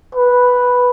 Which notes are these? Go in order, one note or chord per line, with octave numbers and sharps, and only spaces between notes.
B4